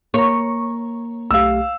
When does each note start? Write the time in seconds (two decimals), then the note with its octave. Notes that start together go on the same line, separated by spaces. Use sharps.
0.14 A#3 C#5 A#5
1.31 B1 A3 G4 F5 E6